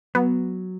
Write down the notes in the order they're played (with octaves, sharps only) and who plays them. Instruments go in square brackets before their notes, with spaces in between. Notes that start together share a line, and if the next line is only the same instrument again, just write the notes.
[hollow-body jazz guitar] F#3 [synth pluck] B3